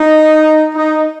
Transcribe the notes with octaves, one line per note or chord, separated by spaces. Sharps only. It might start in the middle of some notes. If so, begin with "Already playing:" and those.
Already playing: D#4
D#4